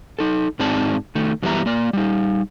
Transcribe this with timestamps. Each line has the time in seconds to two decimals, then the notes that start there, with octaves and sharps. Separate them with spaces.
0.19 D#4 A4
0.59 G#2 G#3 C4 D#4 D5 A5
1.15 D#3 A3
1.42 F#2 E3 G3 B3 E5 A#5
1.66 A#3 D5
1.93 G3 D#4